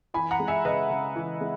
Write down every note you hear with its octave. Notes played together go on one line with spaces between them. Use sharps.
E3 G#5 B5
F#5 A#5
G#3
E5 G#5
C#3 B4 D#5
C#3
E3
G#3